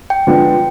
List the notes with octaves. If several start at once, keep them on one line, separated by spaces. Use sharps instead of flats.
G5
D3 F3 G#3 B3 D4